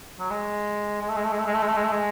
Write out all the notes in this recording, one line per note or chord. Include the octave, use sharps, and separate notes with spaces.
F#3
G#3
G#3
A3
G#3
A3
G#3
A3
G#3
A3
G#3
A3
G#3
A3
G#3